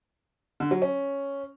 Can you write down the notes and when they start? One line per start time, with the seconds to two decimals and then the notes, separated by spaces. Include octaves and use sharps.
0.60 D3
0.71 F#3
0.82 C#4